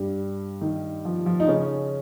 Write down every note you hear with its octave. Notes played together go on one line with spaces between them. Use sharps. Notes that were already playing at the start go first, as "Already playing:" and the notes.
Already playing: G2 G3
D#3
F3
F3
D#4
C#3 C#4